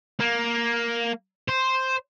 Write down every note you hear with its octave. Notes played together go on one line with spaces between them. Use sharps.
A#3
C5